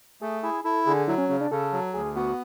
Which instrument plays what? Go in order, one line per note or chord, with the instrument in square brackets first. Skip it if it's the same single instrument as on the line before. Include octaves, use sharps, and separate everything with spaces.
[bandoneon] A3 [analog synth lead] G#4
[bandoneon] E4 [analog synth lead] G#4
[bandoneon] E4 [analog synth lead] A4
[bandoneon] D3 [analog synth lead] G#4
[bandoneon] F#3 [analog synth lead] E4
[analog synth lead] C#4
[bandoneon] C#3 [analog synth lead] C#4
[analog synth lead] D4
[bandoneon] C#3 [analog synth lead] A4
[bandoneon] F#3
[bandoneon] D2 [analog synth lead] G#4
[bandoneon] B3 [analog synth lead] F#4